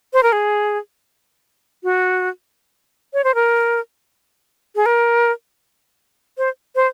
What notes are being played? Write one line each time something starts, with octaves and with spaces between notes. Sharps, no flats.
C5
A#4
G#4
F#4
C#5
C5
A#4
G#4
A#4
C5
C5